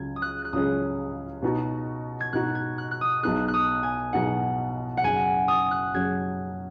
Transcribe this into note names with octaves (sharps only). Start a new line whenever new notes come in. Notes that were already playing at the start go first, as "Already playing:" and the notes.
Already playing: C#2 C#3 F#3 C#4 G#6
D#6
F#6
F#6
C#2 C#3 F#3 C#4 G#4 D#6
B2 B3 D#4 F#4
G#6
B2 B3 D#4 F#4 F#6
G#6
F#6
F#6
D#6
B1 B2 B3 D#4 G#4 F#6
F#6
D#6
G#5
B1 B2 B3 D#4 G#4 F#5
F#5
F#1 F#2 F#3 C#4 G#4 G#5
D#6
F#6
F#1 F#2 F#3 C#4 G#4 G#6